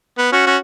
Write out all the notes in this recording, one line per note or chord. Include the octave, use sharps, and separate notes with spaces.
B3
C#4 F#4
C#4 F#4